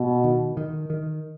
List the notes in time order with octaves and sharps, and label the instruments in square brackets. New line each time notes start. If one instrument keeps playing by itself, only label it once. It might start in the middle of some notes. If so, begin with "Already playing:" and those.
Already playing: [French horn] B2
[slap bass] D#3
D#3
D#3